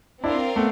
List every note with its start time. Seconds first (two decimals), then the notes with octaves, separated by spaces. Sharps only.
0.24 C4 D4 E4 F4 A#4 D5 F5
0.56 A3 B3